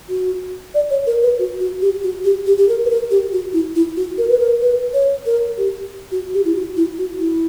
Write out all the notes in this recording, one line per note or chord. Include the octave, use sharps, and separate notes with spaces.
F#4
D5
C#5
A#4
B4
F#4
F#4
G4
F#4
G4
G4
G4
A#4
B4
A#4
G4
F#4
E4
E4
F#4
A#4
B4
A#4
B4
C#5
A#4
G4
F#4
G4
E4
F#4
E4
F#4
E4